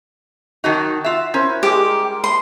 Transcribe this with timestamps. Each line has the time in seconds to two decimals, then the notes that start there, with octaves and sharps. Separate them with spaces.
0.64 D#3 F#3 D#4 F#4 G5 A5
1.04 F4 E5
1.34 C#4 E4 A#4 C5
1.63 G3 G#3 G4
2.24 C6